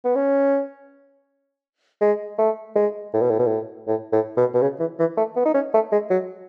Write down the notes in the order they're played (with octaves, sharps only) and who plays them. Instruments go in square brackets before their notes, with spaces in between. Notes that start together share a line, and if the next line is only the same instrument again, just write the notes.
[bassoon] B3
C#4
G#3
A3
G#3
A2
B2
A2
B2
A2
A2
A2
B2
B2
C#3
E3
E3
A3
B3
D#4
C#4
A3
G#3
F#3